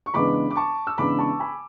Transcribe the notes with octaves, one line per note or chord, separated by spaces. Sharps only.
C#6
E2 C#3 G#3 B3 D4 B5 D6
D6
A5 C#6
E6
E2 C#3 G#3 B3 D4 B5 D6
A5 C#6
G#5 B5